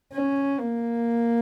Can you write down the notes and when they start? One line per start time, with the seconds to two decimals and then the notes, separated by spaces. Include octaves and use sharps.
0.13 C#4
0.60 A#3